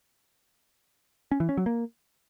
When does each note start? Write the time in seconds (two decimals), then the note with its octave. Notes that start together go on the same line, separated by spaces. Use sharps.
1.31 C#4
1.40 E3
1.49 C#4
1.57 F#3
1.66 A#3